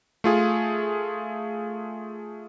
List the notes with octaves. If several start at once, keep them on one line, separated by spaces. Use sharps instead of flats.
A3 F4 G#4